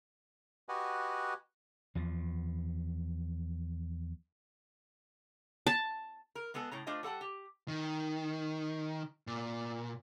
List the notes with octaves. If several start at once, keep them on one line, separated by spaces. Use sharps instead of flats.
F#4 G4 B4 D#5 F#5 G#5
E2 F3
A5
A#4
G#3 B3 G#4 A4
A2 C#3 A#5
A3 D4 F4 C5 D#5
G3 A4 F#5 A5
G4
D#3
A#2